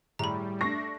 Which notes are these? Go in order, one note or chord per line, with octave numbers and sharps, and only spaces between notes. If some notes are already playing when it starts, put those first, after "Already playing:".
A2 G3 G#4 A#5 B5
A3 D4 C#6 A#6 C7